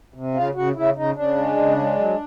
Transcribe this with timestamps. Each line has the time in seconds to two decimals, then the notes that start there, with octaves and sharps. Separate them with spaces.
0.14 C3
0.34 C#3 F4
0.55 C#3 F#4
0.75 C#3 E4
0.95 C#3 D#4
1.16 C#3 D4
1.36 G#3
1.57 C#3
1.77 G#3
1.98 F#3